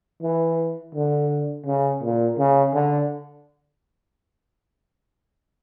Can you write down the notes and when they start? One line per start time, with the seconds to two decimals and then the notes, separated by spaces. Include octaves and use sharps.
0.23 E3
0.94 D3
1.66 C#3
2.02 A#2
2.38 C#3
2.73 D3